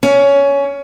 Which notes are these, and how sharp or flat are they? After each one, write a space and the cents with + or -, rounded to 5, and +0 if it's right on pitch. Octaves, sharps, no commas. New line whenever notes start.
C#4 +15